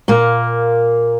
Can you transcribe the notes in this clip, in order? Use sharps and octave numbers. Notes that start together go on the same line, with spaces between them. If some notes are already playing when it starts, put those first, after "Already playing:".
A#2 A#3